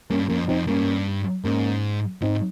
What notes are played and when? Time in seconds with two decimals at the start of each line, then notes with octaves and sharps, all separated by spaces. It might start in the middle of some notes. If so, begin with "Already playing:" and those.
0.10 G2 A#3 C#4
0.28 F2 A#3 C#4
0.48 F2 C4 D#4
0.67 G2 A#3 C#4
1.44 G#2 A#3 C#4
2.22 G#2 C4 D#4